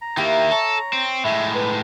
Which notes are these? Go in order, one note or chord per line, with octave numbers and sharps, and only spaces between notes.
A#5
D#3 A#3 E4 G4
A4 C#5
C4
A2 G#3 E5
B4